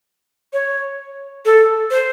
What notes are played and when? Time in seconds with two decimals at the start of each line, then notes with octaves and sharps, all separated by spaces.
0.53 C#5
1.45 A4
1.91 C5